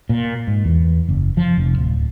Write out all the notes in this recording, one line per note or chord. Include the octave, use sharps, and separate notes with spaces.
A#2
G#2
E2
F#1
F3
F1
D1